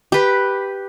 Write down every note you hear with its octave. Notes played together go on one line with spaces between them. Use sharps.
G4 B4